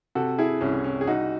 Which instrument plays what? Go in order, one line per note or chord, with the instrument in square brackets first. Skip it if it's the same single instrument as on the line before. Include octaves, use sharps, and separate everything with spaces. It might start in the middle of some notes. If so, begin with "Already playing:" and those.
[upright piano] C3 F#4 A4
E4 G#4
C2 C#4
C#4
G#4
C2 D#4 F#4